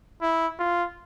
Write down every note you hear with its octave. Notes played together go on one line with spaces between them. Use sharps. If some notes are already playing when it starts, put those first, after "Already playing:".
E4
F4